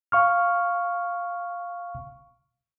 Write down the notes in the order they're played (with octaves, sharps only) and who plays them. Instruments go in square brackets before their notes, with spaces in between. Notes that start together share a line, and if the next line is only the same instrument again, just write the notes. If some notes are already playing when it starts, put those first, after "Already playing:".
[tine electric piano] F5 C#6 F6